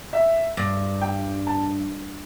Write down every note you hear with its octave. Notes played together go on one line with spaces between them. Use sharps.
E5
G2
G5
A5